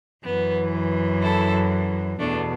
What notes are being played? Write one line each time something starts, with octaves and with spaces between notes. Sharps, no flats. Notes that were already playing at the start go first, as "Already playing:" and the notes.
F#2 E3 B3
E4 A4
E2 B2 A3 D4